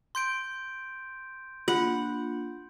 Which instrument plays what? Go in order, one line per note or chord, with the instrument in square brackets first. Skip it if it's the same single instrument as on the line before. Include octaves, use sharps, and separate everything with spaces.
[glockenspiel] C6 G6 D7
[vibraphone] A#3 D4 [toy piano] F4 [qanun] F#5